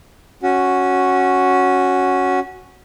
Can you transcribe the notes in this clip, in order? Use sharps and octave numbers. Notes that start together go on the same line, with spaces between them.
C#4 F#4